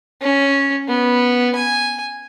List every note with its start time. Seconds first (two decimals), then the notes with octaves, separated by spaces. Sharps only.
0.21 C#4
0.88 B3
1.55 G#5